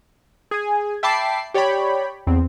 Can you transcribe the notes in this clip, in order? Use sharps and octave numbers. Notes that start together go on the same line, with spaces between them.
G#4 G#5
E5 G5 A5 B5 D6 C7
G4 C#5 D5 G5 B5
E2 C4